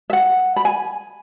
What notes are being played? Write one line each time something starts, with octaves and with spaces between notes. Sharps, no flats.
E5
F#5
B5
G#5